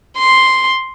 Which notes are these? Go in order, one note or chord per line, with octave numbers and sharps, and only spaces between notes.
C6